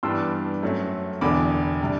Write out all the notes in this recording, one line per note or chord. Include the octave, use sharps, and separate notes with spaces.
G2 E3 G3 B3 D4 C6 E6
F#2 F#3 A3 C4
E1 E2 D3 B5 D6
C3 G3 D4